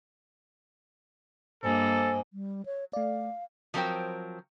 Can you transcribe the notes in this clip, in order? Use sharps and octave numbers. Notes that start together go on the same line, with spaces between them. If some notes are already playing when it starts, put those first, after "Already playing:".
G2 A#3 A4 C5 D#5 G#5
G3
C#5
A3 D5 F5
F3 F#3 C4 A#4 C5 G5